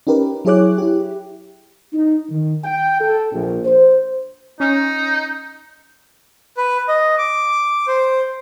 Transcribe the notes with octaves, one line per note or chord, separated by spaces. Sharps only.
C#4 D#4 G4 A#4 B4
F#3 E4 G#4 C#5 D6 F#6
E4 G4
D#4
D#3
G5
A4
A#1
C5
C#4 D#4
B4
D#5
D6
C5